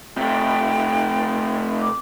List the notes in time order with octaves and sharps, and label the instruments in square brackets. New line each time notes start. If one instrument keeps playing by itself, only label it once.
[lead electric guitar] C3 A3 [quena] G5
[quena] D6